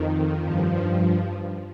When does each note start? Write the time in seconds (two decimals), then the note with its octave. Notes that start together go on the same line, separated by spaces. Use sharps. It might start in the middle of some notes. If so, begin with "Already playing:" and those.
Already playing: F2 D#3
0.40 G2 F3